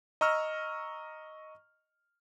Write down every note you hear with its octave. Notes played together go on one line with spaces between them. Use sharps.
D#5 A#5 C#6 E6 F6